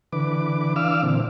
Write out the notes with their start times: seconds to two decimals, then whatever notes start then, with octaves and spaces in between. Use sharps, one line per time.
0.13 D3 E3 B4 D6
0.76 E3 D4 F5 D6 E6 F6
1.03 A#2 D3 E3 C4